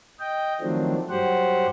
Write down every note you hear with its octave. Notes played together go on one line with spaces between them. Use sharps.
D#5 G5
D#3 F3 F#3 A3 C4 D4
G2 F#3 G4 C5 F#5